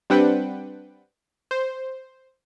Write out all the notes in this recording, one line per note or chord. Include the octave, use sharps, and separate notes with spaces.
G3 C4 D4 B4 F#5 G5
C5